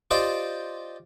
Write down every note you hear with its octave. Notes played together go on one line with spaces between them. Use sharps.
F4 G4 C5 D5 D#5 G5